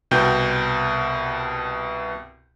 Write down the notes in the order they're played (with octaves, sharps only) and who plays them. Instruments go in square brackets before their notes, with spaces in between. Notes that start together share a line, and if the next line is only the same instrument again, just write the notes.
[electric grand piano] C2 B2 G5 G6